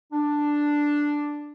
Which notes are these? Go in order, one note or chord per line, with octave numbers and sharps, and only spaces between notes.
D4